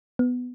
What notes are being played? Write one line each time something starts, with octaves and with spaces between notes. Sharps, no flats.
B3